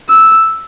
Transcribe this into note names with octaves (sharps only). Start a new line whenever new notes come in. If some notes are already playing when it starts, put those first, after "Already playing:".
E6